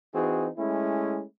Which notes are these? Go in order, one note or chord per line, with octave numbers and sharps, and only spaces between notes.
E3 C4 D#4 F#4 G#4
G#3 A3 C#4 E4